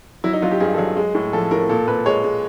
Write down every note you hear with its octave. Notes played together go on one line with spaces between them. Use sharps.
F#3 E4
D#4
F#3 F4
G4
G2 G#4
A4
F#3 G#4
G#3
A2
F3 A4
A2 A#4
A#2 A4
A#2 B4
G#3 C#5
G#3